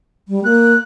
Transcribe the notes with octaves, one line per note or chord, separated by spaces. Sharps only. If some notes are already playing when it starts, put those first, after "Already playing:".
G3
A#3 F#6